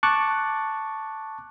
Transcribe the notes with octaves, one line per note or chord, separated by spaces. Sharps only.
A5 C#6 D6 F#6